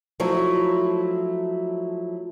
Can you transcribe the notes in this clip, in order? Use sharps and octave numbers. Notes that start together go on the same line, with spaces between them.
F3 F#3 A3 E4